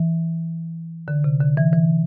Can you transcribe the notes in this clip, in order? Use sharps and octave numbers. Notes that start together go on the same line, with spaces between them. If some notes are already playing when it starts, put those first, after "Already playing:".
Already playing: E3
D3
C3
D3
E3
E3